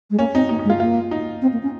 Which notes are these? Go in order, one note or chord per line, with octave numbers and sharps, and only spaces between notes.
G#3
A#3 C#4
C4 D#4
A#3 D#4
D#4
G#3
F4
A#3 F4
D#4
C4
A#3
C#4